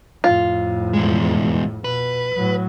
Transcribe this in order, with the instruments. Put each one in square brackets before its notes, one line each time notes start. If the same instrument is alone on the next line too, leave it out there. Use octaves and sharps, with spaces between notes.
[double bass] F2 A2 [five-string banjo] F4
[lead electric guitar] E2 G#3
[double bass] B2 [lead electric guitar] B4
[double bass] A2 F#3